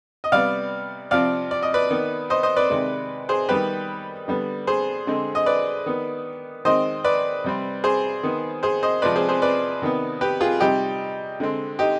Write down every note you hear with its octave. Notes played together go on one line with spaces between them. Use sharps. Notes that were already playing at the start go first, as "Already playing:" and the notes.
D#5
C3 G3 B3 D5 F5
C3 F3 C4 D5 F5
D5
D#5
B4 D5
D#3 B3
C5 D#5
C5 D#5
B4 D5
C3 D#3 G#3
G#4 C5
D#3 G3 B3 G4 B4
D3 G3 B3
G#4 C5
D3 G#3 C4
D#5
B4 D5
D#3 B3
D#3 G#3 C4 C5 D#5
B4 D5
C3 G3 C4
G#4 C5
D#3 B3
G#4 C5
C5 D#5
C3 F3 G#3 C4 B4 D5
G#4 C5
G#4 C5
B4 D5
C3 D#3 B3
G4 B4
F4 G#4
C3 G3 C4 D#4 G4
D3 G#3 C4
D#4 G4